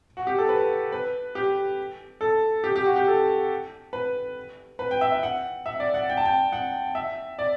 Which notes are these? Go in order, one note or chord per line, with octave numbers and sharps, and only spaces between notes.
F#4
G4
A4
B4
B4
G4
A4
G4
G4
F#4
G4
A4
B4
B4
G5
E5
E5
F#5
E5
D5
F#5
G5
A5
G5
F#5
E5
D5